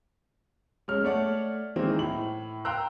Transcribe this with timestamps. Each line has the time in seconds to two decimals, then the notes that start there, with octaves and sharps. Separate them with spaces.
0.88 G#3 C#4 F6
1.04 A3 C#5 D5 F#5
1.76 D#3 E3 G#3 A#3 C4
1.99 A2 F#7
2.65 F5 G5 A#5 C6 E6 F#6